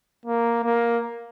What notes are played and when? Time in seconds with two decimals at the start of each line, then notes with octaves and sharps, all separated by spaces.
0.26 A#3
0.64 A#3